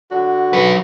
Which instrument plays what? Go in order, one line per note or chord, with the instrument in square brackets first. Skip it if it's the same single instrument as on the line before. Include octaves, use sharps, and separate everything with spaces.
[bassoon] D3 [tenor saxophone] F#4
[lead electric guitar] F#3 B4